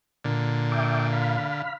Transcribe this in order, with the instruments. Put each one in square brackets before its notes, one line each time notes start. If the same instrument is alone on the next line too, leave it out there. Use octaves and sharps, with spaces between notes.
[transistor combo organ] A#2 D3
[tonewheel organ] E5 G5 D6
F5 B5
[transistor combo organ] D3